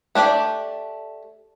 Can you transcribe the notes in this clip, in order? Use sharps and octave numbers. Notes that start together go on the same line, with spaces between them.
A3 D4 G4 D5